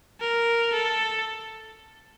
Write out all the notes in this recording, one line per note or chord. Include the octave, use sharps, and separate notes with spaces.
A#4
A4